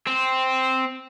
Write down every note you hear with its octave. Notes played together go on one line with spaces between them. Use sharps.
C4